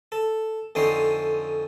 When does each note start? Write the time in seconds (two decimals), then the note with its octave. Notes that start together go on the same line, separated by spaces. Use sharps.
0.12 A4
0.75 F2 D3 C#4 D#4 G5 C6